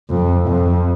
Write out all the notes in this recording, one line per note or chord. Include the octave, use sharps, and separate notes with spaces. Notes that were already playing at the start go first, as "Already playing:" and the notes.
F2
F2